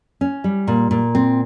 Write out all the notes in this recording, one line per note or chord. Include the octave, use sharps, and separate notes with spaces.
C#4
G3
A#2
A#2
C4